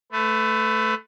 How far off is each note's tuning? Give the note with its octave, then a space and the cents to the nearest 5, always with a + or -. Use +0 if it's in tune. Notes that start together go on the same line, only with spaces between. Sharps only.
A3 +0 B4 +25